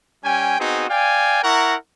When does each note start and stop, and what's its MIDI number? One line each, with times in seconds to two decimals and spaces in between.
0.24 0.59 55
0.24 0.59 61
0.24 0.59 79
0.24 0.59 80
0.59 0.86 59
0.59 0.86 60
0.59 0.86 63
0.59 0.86 66
0.59 0.86 68
0.90 1.42 74
0.90 1.42 77
0.90 1.42 79
0.90 1.42 80
1.44 1.75 64
1.44 1.75 70
1.44 1.75 78
1.44 1.75 82
1.44 1.75 85